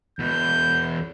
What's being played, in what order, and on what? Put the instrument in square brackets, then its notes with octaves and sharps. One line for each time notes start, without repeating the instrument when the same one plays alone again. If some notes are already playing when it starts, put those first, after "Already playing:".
[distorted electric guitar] E2 B2 [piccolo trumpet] G6